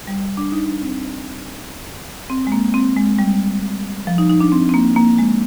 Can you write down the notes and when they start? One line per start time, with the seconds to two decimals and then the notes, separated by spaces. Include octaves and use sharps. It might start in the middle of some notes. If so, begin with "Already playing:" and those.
0.07 G3
0.37 D4
0.52 D#4
0.67 D4
0.81 C4
2.30 C4
2.47 G#3
2.52 A#3
2.74 C4
2.96 G#3
3.19 G3
4.07 F3
4.18 D#4
4.29 D#4
4.40 D4
4.52 C4
4.69 C4
4.74 A#3
4.96 A#3
5.18 G#3